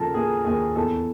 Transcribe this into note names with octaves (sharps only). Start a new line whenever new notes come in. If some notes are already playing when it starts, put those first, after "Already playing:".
Already playing: D#2 C#3 F3 A4 A#4 A5
A#3 G#4 G#5
D#2 G#4 G#5
E2 A4 A5